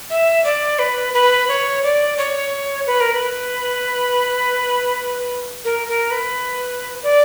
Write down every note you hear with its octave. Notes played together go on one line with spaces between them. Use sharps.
E5
D5
B4
B4
C#5
D5
C#5
B4
A#4
B4
A#4
A#4
B4
D5